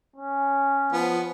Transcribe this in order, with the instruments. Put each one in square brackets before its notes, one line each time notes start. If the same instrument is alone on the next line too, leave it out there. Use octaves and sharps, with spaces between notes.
[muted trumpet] C#4
[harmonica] F3 B3